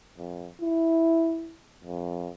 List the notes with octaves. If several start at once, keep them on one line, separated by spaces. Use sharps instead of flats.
F2
E4
F2